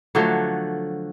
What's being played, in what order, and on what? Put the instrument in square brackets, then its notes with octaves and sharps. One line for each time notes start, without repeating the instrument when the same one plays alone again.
[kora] D3 F3 F#3 A3